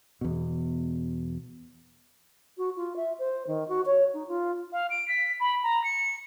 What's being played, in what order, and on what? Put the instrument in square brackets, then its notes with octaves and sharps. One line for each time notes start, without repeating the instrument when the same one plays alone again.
[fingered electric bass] E2 B2
[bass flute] F#4
F4
E5
C5
D#3
F#4
C#5
D#4
F4
[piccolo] F5
D7
B6
B5
A#5
C#7